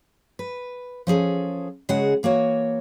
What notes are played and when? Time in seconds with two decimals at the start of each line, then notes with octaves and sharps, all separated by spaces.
0.39 B4
1.07 F3 C#4 G#4 A4
1.89 C#3 G#3 F#4 G#4 F#5
2.23 E3 A#3 F#4 C#5